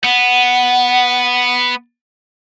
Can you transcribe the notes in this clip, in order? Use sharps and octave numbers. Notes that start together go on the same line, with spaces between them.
B3 F#5